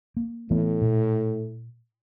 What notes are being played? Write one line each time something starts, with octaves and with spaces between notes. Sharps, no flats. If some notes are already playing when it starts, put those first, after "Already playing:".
A#3
A2 E3 A3 B3
A#2